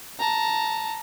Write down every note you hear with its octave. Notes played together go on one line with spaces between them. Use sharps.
A5 A#5